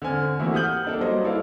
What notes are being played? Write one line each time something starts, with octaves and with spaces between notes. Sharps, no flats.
D3 C4 G#5 F6
E3 A3 A#3 C4 E4 F#4
G4 F#5 D#6 F6 G6 F#7
A#3 D4 A4
F#3 G3 A#3 C5 D5 D#5
E4 A4 B4 D5 F5